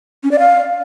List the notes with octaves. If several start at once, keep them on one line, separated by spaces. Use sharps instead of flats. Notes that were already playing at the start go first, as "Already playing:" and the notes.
C#4
D5
F5